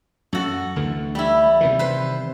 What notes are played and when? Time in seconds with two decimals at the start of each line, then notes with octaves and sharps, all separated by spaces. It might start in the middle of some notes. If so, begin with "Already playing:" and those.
0.33 F#2 F#4 A4
0.76 D2 D3 E3
1.15 G3 E4
1.61 C3 D#3 E3
1.79 B4 C5